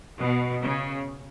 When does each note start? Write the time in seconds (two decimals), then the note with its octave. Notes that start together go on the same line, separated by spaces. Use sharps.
0.17 B2
0.62 C#3